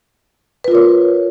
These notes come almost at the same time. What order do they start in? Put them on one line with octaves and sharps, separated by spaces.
B4 F4 A#4 C#5